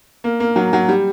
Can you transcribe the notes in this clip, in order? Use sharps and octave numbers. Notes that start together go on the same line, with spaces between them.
A#3
A#3
F#3
F#3
G3